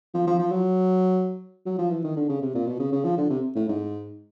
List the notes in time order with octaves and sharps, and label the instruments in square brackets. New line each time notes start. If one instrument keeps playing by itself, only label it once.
[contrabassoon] F3
F3
F3
F#3
F#3
F3
E3
D#3
D3
C#3
C3
A#2
B2
C#3
C#3
F3
D3
C3
A2
G#2